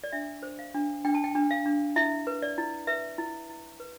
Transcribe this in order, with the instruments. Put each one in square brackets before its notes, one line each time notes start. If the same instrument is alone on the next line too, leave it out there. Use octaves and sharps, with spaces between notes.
[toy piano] D5
D4 E5
C5
F5
D4
D4 G5
A5
G5
D4
F5
D4
E4 E5
B4
D5
E4
B4 E5
E4
E4
B4